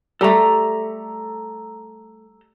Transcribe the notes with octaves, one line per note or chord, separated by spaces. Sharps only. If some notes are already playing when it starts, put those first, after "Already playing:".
G3 A3 A4 A#5